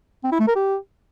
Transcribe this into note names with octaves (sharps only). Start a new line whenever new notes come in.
C4
E4
A3
A#4
G4